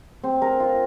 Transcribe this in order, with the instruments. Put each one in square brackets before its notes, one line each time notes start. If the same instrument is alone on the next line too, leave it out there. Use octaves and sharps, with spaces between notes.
[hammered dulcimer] C4
A#4
F4